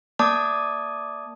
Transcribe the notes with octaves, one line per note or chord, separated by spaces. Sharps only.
A#3 D5 A5 D6 D#6